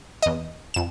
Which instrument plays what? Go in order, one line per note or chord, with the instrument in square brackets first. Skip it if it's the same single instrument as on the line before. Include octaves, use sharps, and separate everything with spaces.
[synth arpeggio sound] E2 D#5
F2 E7